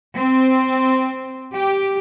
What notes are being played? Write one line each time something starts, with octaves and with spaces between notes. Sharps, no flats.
C4
G4